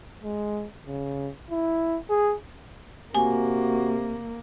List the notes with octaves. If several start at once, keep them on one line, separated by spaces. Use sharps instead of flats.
G#3
C#3
E4
G#4
C3 A#3 F#4 G#5